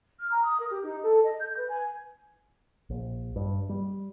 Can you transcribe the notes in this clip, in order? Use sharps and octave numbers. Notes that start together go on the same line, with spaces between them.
F6
A#5
D#6
A#4
G4
D#4
A4
D#5
G6
B4
G#5
A#1
G2
G3